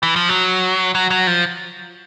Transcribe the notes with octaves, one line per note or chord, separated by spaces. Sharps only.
E3
F3
F#3
F#3
F#3
F3